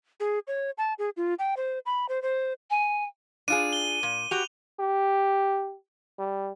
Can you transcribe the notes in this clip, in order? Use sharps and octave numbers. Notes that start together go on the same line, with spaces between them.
G#4
C#5
A5
G#4
F4
G5
C5
B5
C5
C5
G#5
D4 F4 G#4 D#7
G7
A#2
F#4 G4 F7
G4
G3